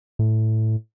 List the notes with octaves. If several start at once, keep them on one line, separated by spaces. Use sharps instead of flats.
A2